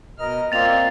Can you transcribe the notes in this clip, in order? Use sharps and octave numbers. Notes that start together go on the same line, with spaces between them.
B2 A#4 D#5 F6
A#3 C4 F4 D5 D#5 A6 F7